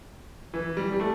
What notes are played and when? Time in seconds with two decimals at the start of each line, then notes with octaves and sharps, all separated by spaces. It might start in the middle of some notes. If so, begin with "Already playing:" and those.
0.54 E3
0.77 G3
0.92 G3
1.00 A3